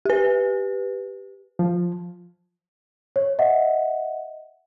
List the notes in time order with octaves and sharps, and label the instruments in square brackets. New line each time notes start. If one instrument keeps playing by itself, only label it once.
[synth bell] G4 B4
[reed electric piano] F3
[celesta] C#5
D#5 E5 F#5